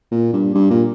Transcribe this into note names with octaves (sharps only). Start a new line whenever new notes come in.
A#2
G2
G2
A#2